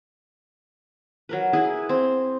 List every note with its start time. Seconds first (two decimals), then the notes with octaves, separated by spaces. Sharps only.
1.29 F#3 A#4 B4
1.53 E4 G#4 B4
1.89 C4